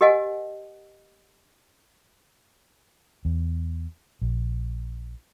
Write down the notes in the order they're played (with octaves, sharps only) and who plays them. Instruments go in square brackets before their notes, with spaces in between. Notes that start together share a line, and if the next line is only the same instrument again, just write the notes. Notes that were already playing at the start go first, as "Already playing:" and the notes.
[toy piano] G4 A#4 D#5 F#5 G#5
[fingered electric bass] E2
A#1